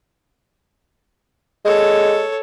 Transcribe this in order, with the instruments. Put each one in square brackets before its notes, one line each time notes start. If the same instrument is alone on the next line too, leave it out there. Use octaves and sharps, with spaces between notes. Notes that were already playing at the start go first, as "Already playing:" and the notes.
[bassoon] G#3 [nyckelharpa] A4 C#5